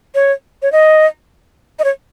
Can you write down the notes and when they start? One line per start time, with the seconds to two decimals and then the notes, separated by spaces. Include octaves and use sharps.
0.15 C#5
0.62 C#5
0.72 D#5
1.79 D#5
1.84 C#5